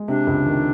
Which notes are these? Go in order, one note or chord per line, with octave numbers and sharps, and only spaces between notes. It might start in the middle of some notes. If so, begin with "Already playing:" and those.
Already playing: G#3
C3 D4
C#2
D#3